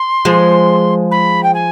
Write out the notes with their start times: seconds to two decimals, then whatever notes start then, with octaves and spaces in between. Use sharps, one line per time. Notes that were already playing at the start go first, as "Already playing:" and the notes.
Already playing: C6
0.25 F3 G#3
1.11 B5
1.43 G5
1.54 G#5